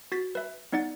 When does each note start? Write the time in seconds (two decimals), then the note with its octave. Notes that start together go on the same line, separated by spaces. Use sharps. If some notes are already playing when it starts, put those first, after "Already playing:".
0.12 F#4 A6 B6
0.35 B4 E5
0.72 B3 D#4 D5 F#5 A6